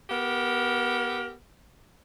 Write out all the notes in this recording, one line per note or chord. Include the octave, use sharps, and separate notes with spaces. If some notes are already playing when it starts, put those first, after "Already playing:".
B3 G4 A#4